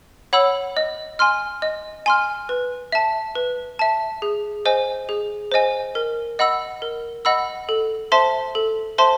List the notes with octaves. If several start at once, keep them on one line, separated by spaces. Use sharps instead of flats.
C#5 F#5 B5 E6
D#5
G#5 C6 F6
D#5
G#5 C6 F6
B4
E5 A5
B4
E5 A5
G#4
C5 D#5 G#5
G#4
C5 D#5 G#5
A#4
D#5 F#5 B5 E6
A#4
D#5 F#5 B5 E6
A4
C5 E5 A5 C6
A4
C5 E5 A5 C6